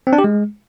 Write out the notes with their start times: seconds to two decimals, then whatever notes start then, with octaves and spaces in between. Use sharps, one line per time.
0.07 C4
0.13 D4
0.18 G4
0.24 G#3